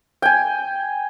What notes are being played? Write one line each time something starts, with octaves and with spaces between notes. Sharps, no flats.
G5 G#5